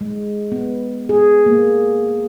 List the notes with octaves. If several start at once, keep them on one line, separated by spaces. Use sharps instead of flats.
G#3
B3
G#4
A#3